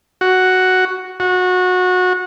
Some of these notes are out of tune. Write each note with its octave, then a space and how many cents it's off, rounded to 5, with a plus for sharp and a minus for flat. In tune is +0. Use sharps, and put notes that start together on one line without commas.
F#4 +5
F#4 -20